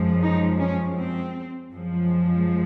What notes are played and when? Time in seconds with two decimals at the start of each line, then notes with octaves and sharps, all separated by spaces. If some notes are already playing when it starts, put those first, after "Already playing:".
Already playing: F#2 F3 G#3
0.23 D#4
0.60 C#4
0.98 C4
1.73 F#2 F3 G#3